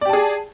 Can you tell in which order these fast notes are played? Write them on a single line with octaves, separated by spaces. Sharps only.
D5 G4 A5 G#4